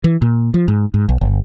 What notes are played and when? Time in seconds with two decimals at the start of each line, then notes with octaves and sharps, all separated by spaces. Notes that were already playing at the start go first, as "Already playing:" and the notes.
0.04 E3
0.22 A#2
0.54 F3
0.68 G#2
0.94 G#2
1.09 B1
1.21 G1